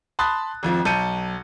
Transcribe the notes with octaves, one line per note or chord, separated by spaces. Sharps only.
A5 B5 C6 D#6 F#6 A6
G#1 F2 F3
B1 A5 G6 C#7 D#7